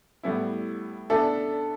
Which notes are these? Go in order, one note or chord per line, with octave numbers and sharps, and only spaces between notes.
A2 G3 B3 E4
B3 D4 A4 E5